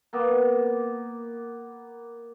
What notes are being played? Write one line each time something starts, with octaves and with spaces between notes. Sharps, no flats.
A#3 B3